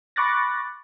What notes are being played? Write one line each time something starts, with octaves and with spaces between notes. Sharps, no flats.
B5 C#6 D6 F#6 A6 A#6